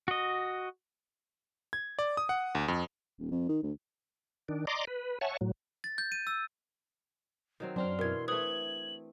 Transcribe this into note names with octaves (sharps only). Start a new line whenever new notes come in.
F#4 D#5
G#6
D5
D#6
F#5
D2
F2
D#1
F2
D#3
D2
D#3 D4
D5 D#5 A#5 C6 D6
B4
C#5 E5 F#5 G#5 A5 C#6
A2 F#3
A6
G6
D#7
E6
D#3 F#3 C4
F#2 C4 D4 C6 F6
B2 E3 A#4 G#6
A3 C4 B4 D#6 G#6 F#7